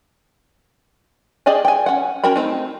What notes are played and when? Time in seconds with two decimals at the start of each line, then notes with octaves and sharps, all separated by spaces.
1.46 G4 G#4 D5 D#5 G#5
1.65 G5 G#5
1.86 C#4 F#5
2.24 C#4 F#4 A#4 G5 B5
2.36 A3 C4 D#4